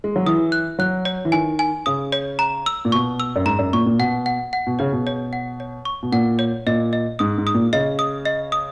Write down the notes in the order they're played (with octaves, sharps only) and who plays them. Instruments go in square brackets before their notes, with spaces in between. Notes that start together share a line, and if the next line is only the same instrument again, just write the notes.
[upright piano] G#3
F#3
[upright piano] E3 [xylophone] D#6
[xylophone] F#6
[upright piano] F#3 [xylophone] F#6
[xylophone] C#5
[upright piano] E3
[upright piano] D#3 [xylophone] G#5
[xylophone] G#5
[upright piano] C#3 [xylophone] D#6
[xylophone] C#5
A#5
E6
[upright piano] A#2
[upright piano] B2 [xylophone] C#6
[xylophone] E6
[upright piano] F#2
[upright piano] G#2 [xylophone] A#5
[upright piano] F#2
[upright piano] A#2 [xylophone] C#6
[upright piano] A#2
[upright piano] B2 [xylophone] F#5
[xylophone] F#5
F#5
[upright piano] B2
[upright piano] C#3 [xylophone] C#5
[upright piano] B2
[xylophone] C#5
F#5
C#5
C#6
[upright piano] B2
[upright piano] A#2 [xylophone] F#5
[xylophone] C#5
[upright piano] A#2 [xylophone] D#5
[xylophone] D#5
[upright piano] G#2 [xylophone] D#6
[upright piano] G#2
[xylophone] D#6
[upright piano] A#2
[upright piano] C#3 [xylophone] D#5
[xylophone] D#6
D#5
D#6